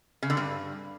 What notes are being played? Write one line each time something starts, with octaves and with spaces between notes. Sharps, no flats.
C#3
D3
G2